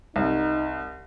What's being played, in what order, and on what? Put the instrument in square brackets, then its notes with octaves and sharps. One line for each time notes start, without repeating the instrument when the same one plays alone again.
[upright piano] C2 [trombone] D#4